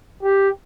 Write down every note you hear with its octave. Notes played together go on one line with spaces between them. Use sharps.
G4